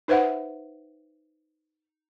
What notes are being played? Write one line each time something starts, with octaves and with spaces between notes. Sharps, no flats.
D#4 B4 C5 E5 F#5